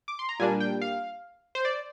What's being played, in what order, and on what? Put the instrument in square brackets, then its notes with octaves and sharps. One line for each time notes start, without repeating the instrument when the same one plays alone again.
[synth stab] D6
C6
A#5
A#2 G3 A#3 D4 G#5
G5
F5
C5
D5